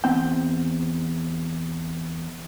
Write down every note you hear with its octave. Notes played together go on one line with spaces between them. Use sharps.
E2 C4 G5